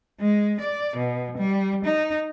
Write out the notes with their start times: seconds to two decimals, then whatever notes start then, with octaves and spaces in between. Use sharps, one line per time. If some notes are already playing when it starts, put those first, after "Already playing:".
0.20 G#3
0.61 D5
0.97 B2
1.38 G3
1.85 D#4